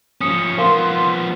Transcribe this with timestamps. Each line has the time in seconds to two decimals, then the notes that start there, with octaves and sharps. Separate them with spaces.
0.21 F3 C#4 D#6 C#7
0.58 F3 B3 A#4 F5 C6